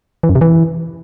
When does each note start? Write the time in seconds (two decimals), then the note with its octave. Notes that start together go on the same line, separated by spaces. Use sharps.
0.23 E3
0.29 F#2
0.35 C3
0.41 E3